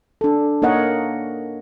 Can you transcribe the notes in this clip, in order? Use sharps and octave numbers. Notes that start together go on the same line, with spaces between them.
D4 A4
A#3 D#4 A#4 C#5 D#5 F#5